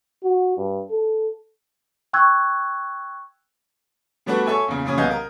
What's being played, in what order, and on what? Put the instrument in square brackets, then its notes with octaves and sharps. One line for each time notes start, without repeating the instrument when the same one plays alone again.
[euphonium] F#4
G2
A4
[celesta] G5 C#6 E6 F#6 G#6
[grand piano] B2 G3 A3 D4 F#4 B4
A4 C#5 E5 G#5
E2 A#2 C#3
F#2 A#2 C#3 C#4 D#6 G#6
C2 B3 D#5 F5 G6 G#6
A#4